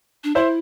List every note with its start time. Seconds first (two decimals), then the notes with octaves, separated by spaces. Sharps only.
0.24 D4
0.35 E4 C5 E5